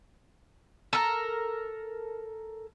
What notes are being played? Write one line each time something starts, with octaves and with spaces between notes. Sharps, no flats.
A4 A#4